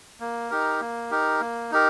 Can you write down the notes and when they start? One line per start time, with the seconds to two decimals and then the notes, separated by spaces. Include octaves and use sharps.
0.20 A#3
0.50 D#4 G4 A#4
0.81 A#3
1.11 D#4 G4 A#4
1.41 A#3
1.72 D#4 G4 A#4